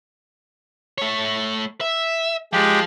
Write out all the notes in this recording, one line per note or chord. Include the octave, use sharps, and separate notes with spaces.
A3 C#5
E5
F3 G#3 G4